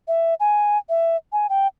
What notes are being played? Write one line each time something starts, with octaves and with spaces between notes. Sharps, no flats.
E5
G#5
E5
G#5
G5